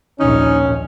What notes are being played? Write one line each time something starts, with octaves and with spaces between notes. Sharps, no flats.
A#1 D#2 C#4 D#4